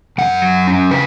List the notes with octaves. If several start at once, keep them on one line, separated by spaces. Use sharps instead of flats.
F#2 F#5
F#3
C#4
C#3 B4